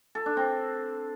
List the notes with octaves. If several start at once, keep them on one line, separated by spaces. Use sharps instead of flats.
A4
D4
C4